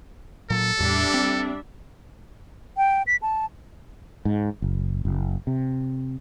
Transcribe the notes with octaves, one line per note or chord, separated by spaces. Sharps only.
A#2 F#3 A4
E2 A2 G3 D4 E5
C4
G5
B6
A5
G#2
F#1
F#1
C3